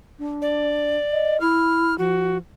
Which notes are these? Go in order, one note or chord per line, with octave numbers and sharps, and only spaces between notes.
D4
D5
D#5
E4 F6
F3 F#4